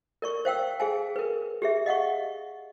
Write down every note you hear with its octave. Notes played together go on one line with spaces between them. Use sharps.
A#4 D5 C#6
C5 F5 G5 E6
G#4 F5 G#5
A#4 B4
G4 G#4 E5
D#5 F5 F#5 C#6